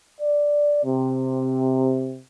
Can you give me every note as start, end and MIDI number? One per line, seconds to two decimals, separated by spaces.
0.20 0.81 74
0.84 2.19 48